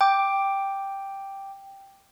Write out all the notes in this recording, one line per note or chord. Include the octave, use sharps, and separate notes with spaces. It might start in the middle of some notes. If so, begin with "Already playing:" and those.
G5 D6